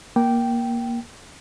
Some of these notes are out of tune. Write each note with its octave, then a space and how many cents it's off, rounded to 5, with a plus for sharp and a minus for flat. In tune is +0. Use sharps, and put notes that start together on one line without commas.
A#3 +15 G5 -10